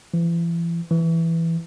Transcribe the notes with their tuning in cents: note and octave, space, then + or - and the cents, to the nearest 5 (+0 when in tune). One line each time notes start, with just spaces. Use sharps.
E3 +40
E3 +5